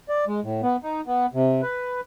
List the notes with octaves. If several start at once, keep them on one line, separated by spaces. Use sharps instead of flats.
D5
G#3
A2
B3
D#4
B3
C3
B4